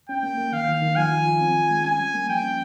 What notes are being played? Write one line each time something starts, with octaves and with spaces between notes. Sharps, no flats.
C#4 G5
A#3
A#3
D#3 F5
D#3
D#3
F3 G#5
F4
F4
C4
D#3
G#3
C#4 G#5
G3
A#3
F3 G5
C#4